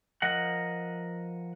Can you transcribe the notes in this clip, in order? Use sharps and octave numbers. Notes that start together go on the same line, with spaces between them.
F3 A#4 D#5 F#5